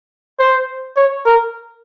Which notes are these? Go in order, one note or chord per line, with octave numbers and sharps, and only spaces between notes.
C5
C#5
A#4